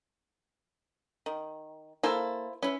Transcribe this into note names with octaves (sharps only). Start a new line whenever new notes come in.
D#3
A#3 E4 A4 C5 F5
C#4 E4 B4